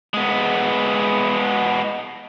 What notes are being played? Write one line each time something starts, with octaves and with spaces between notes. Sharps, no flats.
G#3 B3